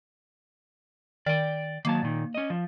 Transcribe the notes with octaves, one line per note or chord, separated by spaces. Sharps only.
D#3 D5 G5
D#3 F#3 A#3 A5
A#2 D#3
C#4 D#5
F3